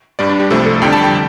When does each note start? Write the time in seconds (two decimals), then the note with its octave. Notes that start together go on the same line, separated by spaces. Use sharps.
0.19 G2 G3 D5
0.29 D4
0.40 G4
0.51 C2 C3 F3 A3 A4
0.66 A4
0.82 F2 D3 G3 G5
0.93 A5
1.04 G5